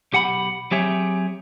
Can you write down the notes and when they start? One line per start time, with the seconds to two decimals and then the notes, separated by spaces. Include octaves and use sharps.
0.13 B1 G4 F#5 G#5 B5
0.71 F#3 C4 G4 G#4 C#5 E5